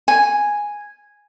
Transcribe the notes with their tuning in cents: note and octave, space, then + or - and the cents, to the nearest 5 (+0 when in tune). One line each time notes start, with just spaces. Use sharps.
G#5 -5